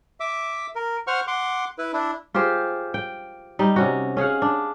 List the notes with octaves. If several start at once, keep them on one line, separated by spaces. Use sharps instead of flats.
E5 D6
A#4
C5 F#5 C#6 F6
F#5 C6 D6
E4 B4
D4 E4
F4 G4 G#4 C5
G5
G3 D#4
C3 C#4 F#4
C#4 G#4 F5 F#5
D4